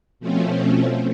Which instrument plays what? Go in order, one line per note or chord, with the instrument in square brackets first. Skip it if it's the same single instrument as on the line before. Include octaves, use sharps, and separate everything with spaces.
[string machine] B2 F3 A3 C4 C#4